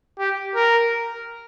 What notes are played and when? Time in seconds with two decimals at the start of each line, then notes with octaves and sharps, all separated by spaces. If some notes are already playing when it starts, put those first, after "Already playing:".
0.19 G4
0.55 A#4